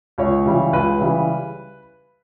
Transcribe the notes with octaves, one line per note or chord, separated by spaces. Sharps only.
C#2 C#5
C#3 E3 G3
C#2 B4
C#3 E3 G3